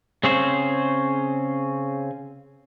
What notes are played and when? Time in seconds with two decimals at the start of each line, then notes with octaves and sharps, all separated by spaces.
0.24 C#3 C4 C#4 G#4 C5